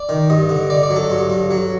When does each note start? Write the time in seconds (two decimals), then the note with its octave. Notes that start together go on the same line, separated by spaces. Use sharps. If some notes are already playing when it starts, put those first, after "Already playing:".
Already playing: D5
0.09 D#3
0.30 G2 D#5
0.49 D3
0.70 D3 D5
0.83 D5
0.90 F#3
0.96 A4
1.10 G2
1.30 G2
1.51 F#3